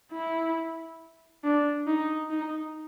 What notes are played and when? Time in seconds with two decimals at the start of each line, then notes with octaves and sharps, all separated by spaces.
0.12 E4
1.44 D4
1.87 D#4
2.30 D#4